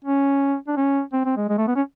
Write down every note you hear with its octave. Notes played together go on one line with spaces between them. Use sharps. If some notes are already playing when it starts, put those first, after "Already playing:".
C#4
D4
C#4
C4
C4
G#3
G#3
A3
B3
C#4